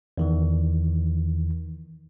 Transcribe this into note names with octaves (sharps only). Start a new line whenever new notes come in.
E2 D#3 E3